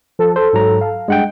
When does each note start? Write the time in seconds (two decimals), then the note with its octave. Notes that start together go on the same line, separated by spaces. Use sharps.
0.19 F3 A4
0.36 A4 C5
0.53 G#2 F#3 A#5
0.81 F5
1.08 G2 G#3 F#5 G5